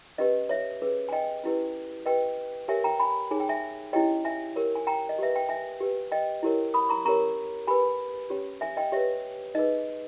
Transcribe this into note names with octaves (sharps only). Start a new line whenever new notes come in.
C#4 G4 B4 D#5
C#5 E5
C#4 G#4 B4
G#5
D#5 G5
C#4 E4 G4 B4
G4 B4 D#5 G5
G4 A#4 C#5 E5 G#5
G5 A#5
G#5 B5
D#4 G#4 C#5 G#5
G5
E5 G#5
C#4 E4 G4 C#5 D#5 G5
E5 G#5
G4 A#4 C#5
G#5
G5 A#5
D#5
G4 B4 E5
G5
E5 G#5
G4 B4
D#5 G5
E4 G4 A#4 C#5
B5 D#6
A#5 C#6
C#4 G4 A#4 C#5 A#5 C#6
G4 B4 G#5 B5
C#4 G4 C#5
E5 G#5
D#5 G5
G4 B4 C#5 E5
D#4 G#4 B4 D#5